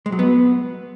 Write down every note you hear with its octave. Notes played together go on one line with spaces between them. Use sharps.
G#3
F#3
B3